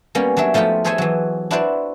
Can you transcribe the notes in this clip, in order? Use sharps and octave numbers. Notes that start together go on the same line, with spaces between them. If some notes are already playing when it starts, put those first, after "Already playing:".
G3 A#3 B3 C#4 D5
F#3 D4 C#5 E5
F3 A3 D#4 F4 G4
G#4 A4 C5 C#5 E5 G#5
E3 F#3
D4 E4 F#4 B4 C5 D5